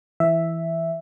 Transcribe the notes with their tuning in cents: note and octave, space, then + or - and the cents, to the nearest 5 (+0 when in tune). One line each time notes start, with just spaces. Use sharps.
E3 +0 E5 +0